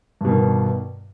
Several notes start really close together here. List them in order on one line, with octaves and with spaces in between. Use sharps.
G2 B2 D#3